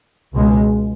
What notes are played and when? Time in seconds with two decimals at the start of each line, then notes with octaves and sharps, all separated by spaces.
0.35 C#2 B2 G#3